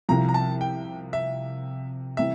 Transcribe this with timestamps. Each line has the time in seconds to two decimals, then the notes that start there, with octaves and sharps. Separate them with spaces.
0.09 C2 C3 F3 A#5
0.29 A#5
0.34 A5
0.61 G5
1.13 E5
2.17 C3 E3 G3 E5